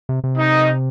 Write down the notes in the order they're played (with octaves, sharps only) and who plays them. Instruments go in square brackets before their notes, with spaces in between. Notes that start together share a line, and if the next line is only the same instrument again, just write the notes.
[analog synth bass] C3
C3
[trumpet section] D#4